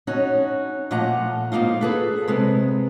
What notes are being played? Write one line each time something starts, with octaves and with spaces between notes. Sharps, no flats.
C#4 D#4 F#4
A#2 F3 A3 D#5 F#5 A#5
G#2 G3 A#3 D#4 F4
G#4 A4 B4
C3 G#3 B3